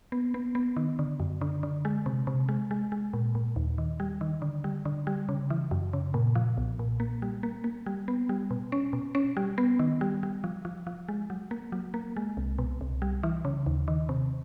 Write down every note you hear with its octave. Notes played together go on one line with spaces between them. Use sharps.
B3
B3
B3
D#3
D3
F#2
D3
D3
G#3
C3
C3
G#3
G#3
G#3
A#2
A#2
D#2
D#3
G3
D#3
D3
G3
D3
G3
C#3
E3
F#2
C#3
A#2
F3
B1
A#2
A#3
G3
A#3
A#3
G3
B3
G3
B2
C#4
B2
C#4
G3
B3
D#3
G3
G3
F3
F3
F3
G#3
F#3
A#3
F#3
A#3
G#3
C2
B2
C2
G3
E3
C#3
D#2
D#3
C3